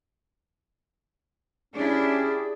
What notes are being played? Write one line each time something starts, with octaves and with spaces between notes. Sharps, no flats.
C#4 D4 E4 G4 G#4 D5